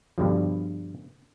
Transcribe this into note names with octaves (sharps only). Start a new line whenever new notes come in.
G2 B2 D3 F3